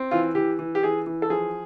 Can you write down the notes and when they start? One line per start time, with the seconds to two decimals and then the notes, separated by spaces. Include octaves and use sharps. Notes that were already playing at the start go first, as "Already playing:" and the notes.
Already playing: C4
0.11 E3 F4
0.35 E3 G4
0.59 E3
0.75 G4
0.83 E3 G#4
1.07 E3
1.22 A4
1.30 F3 G#4